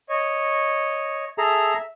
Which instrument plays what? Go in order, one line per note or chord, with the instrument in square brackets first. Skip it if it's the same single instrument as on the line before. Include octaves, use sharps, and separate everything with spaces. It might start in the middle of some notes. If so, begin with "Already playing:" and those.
[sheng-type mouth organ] C#5 D#5
[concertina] G#4 A4 A#5 [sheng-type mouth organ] E5